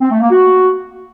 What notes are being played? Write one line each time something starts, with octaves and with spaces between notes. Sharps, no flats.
C4
A3
A#3
F#4